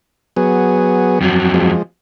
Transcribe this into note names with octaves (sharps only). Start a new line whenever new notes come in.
F#3 B3 G#4
F2 F#3
F3 G#3